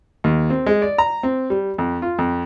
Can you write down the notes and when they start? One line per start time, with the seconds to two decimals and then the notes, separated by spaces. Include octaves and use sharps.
0.24 D#2
0.50 C4
0.66 G#3
0.82 D5
0.98 A#5
1.23 C4
1.50 G3
1.78 F2
2.02 F4
2.19 F2